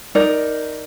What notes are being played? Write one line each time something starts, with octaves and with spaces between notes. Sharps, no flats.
D#4 A#4 D5